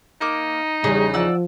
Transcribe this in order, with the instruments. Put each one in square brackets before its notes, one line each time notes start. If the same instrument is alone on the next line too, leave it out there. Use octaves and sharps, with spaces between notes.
[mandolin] A#3 D6 [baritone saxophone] D#4
[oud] E2 C#3 [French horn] G3 [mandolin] G#4
[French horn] F3 [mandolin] D5 F#5 E6